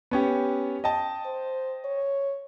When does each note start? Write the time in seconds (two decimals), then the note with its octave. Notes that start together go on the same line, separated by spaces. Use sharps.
0.11 B3 C#4 G4
0.84 D#5 G5 A5
1.26 C5
1.84 C#5